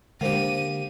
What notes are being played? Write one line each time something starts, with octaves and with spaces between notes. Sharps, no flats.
D3 G#3 A#3 D4 G4 C5 D#7